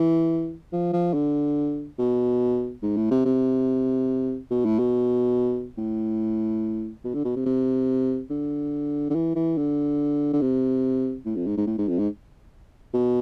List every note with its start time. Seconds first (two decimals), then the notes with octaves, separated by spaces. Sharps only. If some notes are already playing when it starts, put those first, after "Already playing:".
Already playing: E3
0.72 F3
0.93 F3
1.14 D3
1.99 B2
2.82 G#2
2.96 A2
3.11 C3
3.25 C3
4.51 B2
4.65 A2
4.79 B2
5.78 A2
7.05 B2
7.14 D3
7.25 B2
7.36 C3
7.46 C3
8.30 D3
9.10 D3
9.15 E3
9.35 E3
9.57 D3
10.33 D3
10.41 C3
11.25 A2
11.36 F2
11.46 G#2
11.57 G#2
11.67 A2
11.78 G#2
11.89 F2
11.99 G#2
12.94 B2